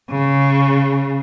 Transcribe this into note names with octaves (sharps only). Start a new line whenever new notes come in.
C#3